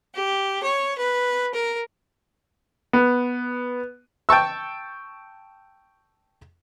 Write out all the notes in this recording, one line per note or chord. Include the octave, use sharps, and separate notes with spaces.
G4
C#5
B4
A#4
B3
G5 A5 C#6 E6